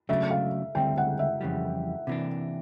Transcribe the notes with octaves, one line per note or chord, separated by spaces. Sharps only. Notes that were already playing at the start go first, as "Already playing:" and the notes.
C#3 F#3 A3 D4 E5
F5
D2 D3 G3 C4 G5
F#5
E5
F2 C#3 E3 G3
C3 E3 G3 A#3 D4